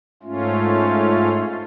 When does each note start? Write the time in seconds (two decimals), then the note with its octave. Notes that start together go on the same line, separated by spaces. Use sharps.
0.23 G#2 A3 C#4 F4